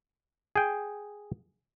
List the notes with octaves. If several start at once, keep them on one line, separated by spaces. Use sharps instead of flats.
G#4 G5